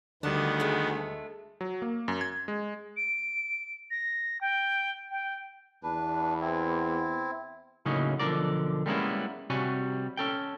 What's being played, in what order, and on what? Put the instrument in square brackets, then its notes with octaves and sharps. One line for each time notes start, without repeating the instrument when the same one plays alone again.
[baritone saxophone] D2 [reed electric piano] D3 G3 [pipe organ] D#3 B3 [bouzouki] D4
[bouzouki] G#3 A3
[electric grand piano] F#3
A#3
F#2
G#6
G#3
[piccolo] D7
A#6
G5
G5
[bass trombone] E2 [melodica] D4 B4
[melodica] C4 E4
[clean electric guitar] A2 C#3 F#3 A#3 C#4 D#4
B1 D3 F3 A#3 A#4 D5
G3 G#3 A#3 B3 C#4 E4
C3 G3 F#4 C#5 G#5
C#4 A4 G5